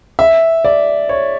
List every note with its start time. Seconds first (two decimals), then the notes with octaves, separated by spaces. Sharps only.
0.19 E5
0.65 D5
1.09 C#5